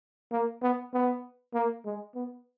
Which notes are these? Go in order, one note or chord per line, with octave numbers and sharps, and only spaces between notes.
A#3
B3
B3
A#3
G#3
B3